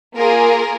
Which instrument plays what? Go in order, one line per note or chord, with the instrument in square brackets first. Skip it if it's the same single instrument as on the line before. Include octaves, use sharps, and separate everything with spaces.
[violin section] A#3 F4 G#4 A#4